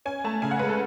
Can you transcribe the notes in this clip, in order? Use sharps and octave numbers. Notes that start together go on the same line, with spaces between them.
C#4 G#5
A3 A5
C#3 G#5
F#5
G#3 B4
A4